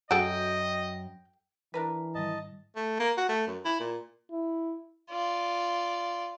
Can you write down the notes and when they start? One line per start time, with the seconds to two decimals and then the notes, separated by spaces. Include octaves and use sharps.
0.11 F#2 F#4 G#4 A4 D#5 G5
1.74 E3 D4 A#4 B4
2.15 G#2 D#3 G3 D#5 A5
2.76 A3
3.00 A#3
3.17 F#4
3.29 A3
3.47 F#2
3.65 E4
3.80 A#2
4.32 E4
5.10 F4 D5